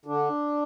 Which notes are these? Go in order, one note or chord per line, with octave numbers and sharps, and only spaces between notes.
D3 D4